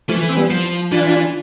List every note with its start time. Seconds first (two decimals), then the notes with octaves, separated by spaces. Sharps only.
0.09 E3 F3 A3
0.29 C4
0.37 G3 B3
0.50 F3
0.92 E3 D4 F4